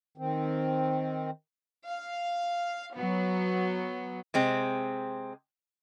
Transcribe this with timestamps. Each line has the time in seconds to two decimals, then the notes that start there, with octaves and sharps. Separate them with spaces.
0.18 D#3 C4
1.87 F5
2.94 F#3 B3
4.34 C3 G#3 C4